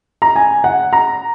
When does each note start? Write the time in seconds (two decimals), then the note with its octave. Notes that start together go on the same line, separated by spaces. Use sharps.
0.22 A#5
0.36 G#5
0.64 F#5
0.93 A#5